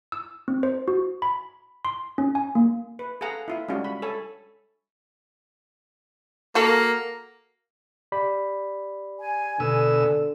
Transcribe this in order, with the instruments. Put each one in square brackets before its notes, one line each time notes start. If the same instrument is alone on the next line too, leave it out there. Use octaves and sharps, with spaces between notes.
[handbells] E6
C4
C5
F#4
B5
C6
C#4
G#5
A#3
[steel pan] B4
G#4 A4 F5 F#5 A#5
E4 F4 E5
G3 G#3 C#4 D4 F4 F#4
B5
A4 C#5 G#5 B5
[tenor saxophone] A#3 [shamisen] F#4 A4
[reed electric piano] G4 D5 B5
[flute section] G#5
[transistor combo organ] B2 E6 [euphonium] D3